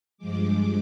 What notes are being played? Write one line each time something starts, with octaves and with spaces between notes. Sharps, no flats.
G2 F3 G#3 D6